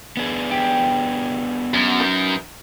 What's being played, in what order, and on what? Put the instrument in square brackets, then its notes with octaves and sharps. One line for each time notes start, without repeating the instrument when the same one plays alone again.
[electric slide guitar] B3 D4 G#4
[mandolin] G4
[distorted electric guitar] F#2
[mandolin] D#4 A#4 B4